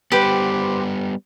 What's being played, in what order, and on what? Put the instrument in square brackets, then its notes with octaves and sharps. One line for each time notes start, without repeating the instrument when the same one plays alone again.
[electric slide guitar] G3 B3 [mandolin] G4 B4 C5